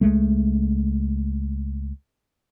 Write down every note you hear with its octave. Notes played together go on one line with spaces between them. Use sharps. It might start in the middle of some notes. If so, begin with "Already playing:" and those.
C#2 G#3 A3